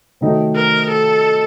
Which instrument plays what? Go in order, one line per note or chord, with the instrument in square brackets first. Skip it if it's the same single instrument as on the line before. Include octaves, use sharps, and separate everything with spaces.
[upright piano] C3 D#3 F#3 A3 D#4
[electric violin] A#4
A4